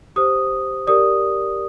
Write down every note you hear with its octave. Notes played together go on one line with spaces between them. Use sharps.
G4 C5 D#6
G4 A#4 D5 D#6